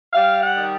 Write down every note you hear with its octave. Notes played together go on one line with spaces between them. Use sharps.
G3 F5
F#5
D#3